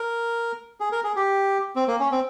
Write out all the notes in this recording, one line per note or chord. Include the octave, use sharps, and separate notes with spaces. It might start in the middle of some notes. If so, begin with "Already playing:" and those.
Already playing: A#4
G#4
A#4
G#4
G4
C4
A#3
C#4
C4